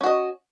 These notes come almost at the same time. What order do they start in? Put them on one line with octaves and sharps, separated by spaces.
C#4 F#4 D#5